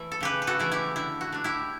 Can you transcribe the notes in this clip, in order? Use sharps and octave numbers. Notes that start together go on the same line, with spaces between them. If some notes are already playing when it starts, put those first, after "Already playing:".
Already playing: E3 A3 E4
A4
C#3 G4 B4
B4
F#4 A4
E3 A3 E4
E4 G4
D3 E4
F#4
A3 D4
E4 G4